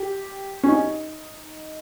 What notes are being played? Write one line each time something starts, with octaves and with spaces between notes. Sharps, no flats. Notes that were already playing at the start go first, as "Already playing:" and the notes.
Already playing: G4
C#4
D#4